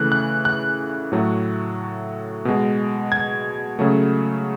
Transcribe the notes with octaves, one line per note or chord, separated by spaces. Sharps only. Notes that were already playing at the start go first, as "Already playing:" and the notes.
Already playing: C#3 E3 A3 F#6
F#6
F#6
A2 F#3 A3
B2 G#3
G#6
C#3 F#3 A3